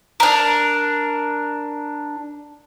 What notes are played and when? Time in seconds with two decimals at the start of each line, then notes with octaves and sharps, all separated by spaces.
0.20 D4 A#4